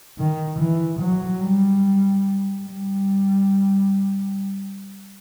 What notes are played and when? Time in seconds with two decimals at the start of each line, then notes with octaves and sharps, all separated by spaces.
0.18 D#3
0.59 E3
1.00 F#3
1.41 G3
2.64 G3